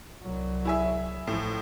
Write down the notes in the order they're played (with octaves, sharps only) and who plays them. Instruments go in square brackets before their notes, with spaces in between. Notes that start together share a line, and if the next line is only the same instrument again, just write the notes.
[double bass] C2 F#3
[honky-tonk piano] E4 G#4 E5
[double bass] A1 F3 [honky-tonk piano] A2